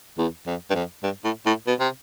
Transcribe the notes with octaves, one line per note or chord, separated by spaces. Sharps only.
E2
F2
G2
F2
G2
A2
A2
B2
C3